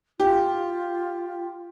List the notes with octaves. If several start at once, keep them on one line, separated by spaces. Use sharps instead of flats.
F4 G4